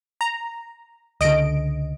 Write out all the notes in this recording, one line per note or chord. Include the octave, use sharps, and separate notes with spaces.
A#5
C#2 D3 D#5 D7